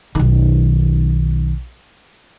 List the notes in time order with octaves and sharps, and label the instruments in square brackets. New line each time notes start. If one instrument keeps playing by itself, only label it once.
[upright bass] B1 D#3